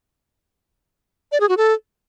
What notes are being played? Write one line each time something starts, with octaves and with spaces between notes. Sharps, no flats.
D5
G#4
F#4
A4